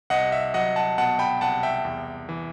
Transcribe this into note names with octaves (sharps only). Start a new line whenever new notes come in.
C2 D#5 F#5
E5
F#3 D#5 F#5
F#5 A5
B2 F#5 A5
G5 B5
C2 F#5 A5
E5 G5
E2
E3